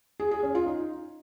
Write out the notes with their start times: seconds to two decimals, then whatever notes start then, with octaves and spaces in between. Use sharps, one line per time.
0.20 G#4
0.31 G#4
0.43 C#4
0.55 F4
0.66 D#4